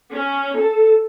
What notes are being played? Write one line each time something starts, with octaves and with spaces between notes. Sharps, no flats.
C#4
A4